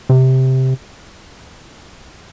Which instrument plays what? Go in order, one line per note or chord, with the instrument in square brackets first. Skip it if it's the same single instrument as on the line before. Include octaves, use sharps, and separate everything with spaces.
[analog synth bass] C3